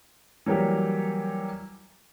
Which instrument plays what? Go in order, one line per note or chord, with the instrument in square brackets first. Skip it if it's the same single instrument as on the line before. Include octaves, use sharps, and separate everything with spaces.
[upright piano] E3 F#3 G3 A#3 G4